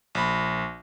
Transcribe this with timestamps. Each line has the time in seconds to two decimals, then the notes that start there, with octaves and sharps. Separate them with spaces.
0.15 A#1 B5